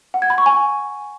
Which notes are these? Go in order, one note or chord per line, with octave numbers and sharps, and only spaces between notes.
F#5
G#6
B5
C#6
G#5